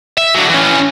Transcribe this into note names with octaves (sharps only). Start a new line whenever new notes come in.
E5
D3 F#3
E3 C#4